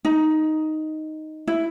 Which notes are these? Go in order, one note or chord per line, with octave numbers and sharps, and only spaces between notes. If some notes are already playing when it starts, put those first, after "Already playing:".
D#4
E4